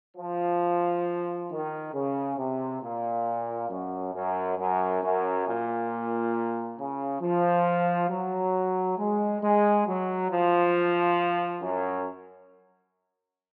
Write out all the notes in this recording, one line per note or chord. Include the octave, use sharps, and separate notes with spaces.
F3
D#3
C#3
C3
A#2
F#2
F#2
F#2
F#2
A#2
C#3
F3
F#3
G#3
G#3
F#3
F3
F#2